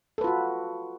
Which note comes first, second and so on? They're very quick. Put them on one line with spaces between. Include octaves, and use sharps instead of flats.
A4 B4 F4 F#4